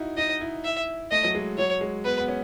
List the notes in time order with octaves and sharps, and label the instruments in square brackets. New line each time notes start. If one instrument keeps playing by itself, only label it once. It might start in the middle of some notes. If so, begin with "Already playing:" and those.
Already playing: [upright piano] D#4 E4 F#4
[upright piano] D#4 [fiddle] D#5
[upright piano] E4
[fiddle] E5
[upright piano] A3 [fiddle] D#5
[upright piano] F#3
G#3
[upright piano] F#3 [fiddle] C#5
[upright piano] G#3
[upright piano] B3 [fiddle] B4
[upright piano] B3
C#4